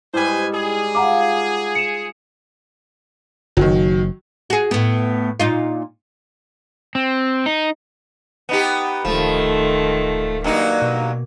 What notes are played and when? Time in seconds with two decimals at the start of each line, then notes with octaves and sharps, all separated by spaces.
0.14 G#2 G3 E4 B4 C5 G#5
0.54 G#4
0.95 F4 F#5 A#5 D6
1.75 C#7 E7
3.57 F#1 D#3 F#3
4.50 F#4 G#4
4.71 A2 B3
5.40 A#2 D#4 F4
6.95 C4
7.46 D#4
8.49 B3 D#4 G4
9.05 D1 D#3 F3 A3
10.44 G2 F#3 A#3 D#4
10.82 B2